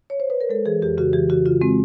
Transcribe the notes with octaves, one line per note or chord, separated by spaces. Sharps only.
C#5
C5
B4
A#4
G#3 A4
E3 G#4
F2 G4
C#3 F#4
E3 G4
C#3 F#4
C#3 F4
G#3 C4